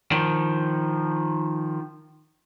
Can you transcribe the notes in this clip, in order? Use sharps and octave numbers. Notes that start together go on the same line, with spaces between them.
D#3 F3